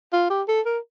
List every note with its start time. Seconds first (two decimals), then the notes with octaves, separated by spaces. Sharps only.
0.13 F4
0.30 G4
0.48 A4
0.66 A#4